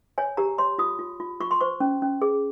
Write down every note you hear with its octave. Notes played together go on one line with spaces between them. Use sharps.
C#5 G#5
G4 A#5
C#5 C6
F4 D#6
F4
F4
F4 C#6
C6
C5 C#6
C#4
C#4
G#4